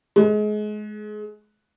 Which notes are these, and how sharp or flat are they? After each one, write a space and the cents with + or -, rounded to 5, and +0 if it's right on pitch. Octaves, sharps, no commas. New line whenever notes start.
G#3 +30